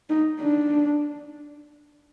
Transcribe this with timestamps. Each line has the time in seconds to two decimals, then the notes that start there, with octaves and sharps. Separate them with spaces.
0.09 D#4
0.41 D4